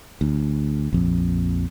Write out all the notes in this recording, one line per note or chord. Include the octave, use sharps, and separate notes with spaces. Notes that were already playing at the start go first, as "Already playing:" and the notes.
D2
A#1 F2